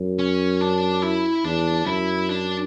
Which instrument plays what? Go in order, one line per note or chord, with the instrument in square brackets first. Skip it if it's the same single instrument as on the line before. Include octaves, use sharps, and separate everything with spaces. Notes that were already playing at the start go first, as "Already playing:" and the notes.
Already playing: [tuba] F#2
[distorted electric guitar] C#4
D4
E4
[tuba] E2 [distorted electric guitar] D4
[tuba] F#2 [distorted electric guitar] E4
[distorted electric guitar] D4